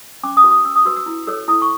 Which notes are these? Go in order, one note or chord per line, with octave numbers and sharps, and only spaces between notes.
C#4 D6
D#6
F#4 B4
D#6
C#4 E6
D#6
F#4 B4 E6
E6
E4
A4 C#5 E6
E4 D#6
C#6